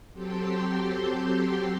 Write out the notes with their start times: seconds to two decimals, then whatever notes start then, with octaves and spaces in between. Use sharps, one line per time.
0.13 F#3 C4 G4 A4 G5 C6